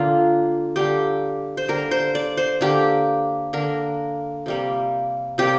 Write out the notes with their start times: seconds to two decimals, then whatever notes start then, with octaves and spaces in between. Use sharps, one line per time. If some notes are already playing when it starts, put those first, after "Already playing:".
Already playing: D3 A#3 F4
0.76 D3 G3 A#3 G4
1.57 C5
1.68 D3 G3 A#3 A#4
1.91 C5
2.15 D5
2.37 C5
2.61 D3 A#3 G4
3.53 D3 A#3 A#4
4.46 C3 G3 A#3
5.38 C3 G3 A#3 G4